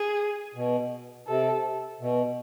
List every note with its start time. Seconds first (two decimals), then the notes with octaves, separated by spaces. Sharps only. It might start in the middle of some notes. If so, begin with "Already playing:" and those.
Already playing: G#4
0.54 B2
1.27 C3 A4
2.00 B2